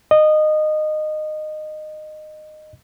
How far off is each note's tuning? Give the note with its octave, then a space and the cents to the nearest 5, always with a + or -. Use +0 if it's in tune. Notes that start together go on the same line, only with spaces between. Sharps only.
D#5 -20